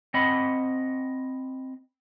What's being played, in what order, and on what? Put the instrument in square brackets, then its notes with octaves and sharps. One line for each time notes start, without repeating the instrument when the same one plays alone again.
[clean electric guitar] C4 D#5 F#5 B5